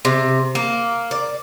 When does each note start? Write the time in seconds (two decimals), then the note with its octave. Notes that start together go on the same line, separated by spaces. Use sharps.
0.05 C3
0.55 A#3
1.11 D5